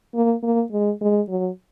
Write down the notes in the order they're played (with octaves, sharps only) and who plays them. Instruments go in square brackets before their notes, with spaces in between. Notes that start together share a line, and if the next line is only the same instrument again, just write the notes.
[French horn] A#3
A#3
G#3
G#3
F#3